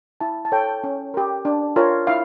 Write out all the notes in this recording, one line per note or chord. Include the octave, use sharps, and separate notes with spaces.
E4 A5
A5
A4 C#5 G5
C#4
G4 A#4
D4
F4 A#4 C#5
E4 F5